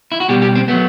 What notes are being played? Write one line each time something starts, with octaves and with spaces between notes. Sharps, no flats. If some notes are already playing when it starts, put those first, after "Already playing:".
E4
F#4
B2 G3 G4
G4
C4
F#3 A3 B3